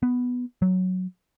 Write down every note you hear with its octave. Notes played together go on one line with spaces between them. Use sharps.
B3
F#3